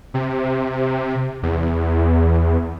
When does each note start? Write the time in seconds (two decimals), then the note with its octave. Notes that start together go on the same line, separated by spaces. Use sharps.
0.14 C3
1.43 E2